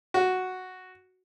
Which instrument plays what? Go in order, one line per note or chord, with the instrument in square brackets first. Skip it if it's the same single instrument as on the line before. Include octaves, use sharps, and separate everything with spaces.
[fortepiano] F#4